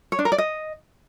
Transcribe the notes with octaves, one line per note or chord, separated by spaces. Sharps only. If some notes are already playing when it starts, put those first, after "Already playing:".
C#5
D4
A#4
D5
D#5